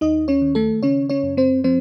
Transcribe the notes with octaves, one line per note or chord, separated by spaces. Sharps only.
D#2 D#4 D#5
C#4 C#5
D#3
A3 A4
C#3 C#4 C#5
C#4 C#5
F#2
C4 C5
F3 C4 C5